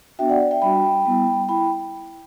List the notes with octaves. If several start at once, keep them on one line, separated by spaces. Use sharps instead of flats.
B3 D4 F#4 E5 G5
D5 F#5
E5 G5
G3 D4 F#4 G5 B5
G3 B3 E4
E4 G5 B5